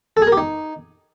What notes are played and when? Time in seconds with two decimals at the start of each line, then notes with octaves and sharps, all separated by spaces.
0.17 A4
0.22 G#4
0.27 A#4
0.32 G4
0.38 D#4